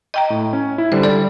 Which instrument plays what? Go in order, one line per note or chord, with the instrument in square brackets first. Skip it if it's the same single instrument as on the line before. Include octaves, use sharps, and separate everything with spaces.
[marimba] D#5 G5 A#5
[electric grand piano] A2
C#4
E4
[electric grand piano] D3 G3 [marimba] C5
[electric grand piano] G3 [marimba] A4 D5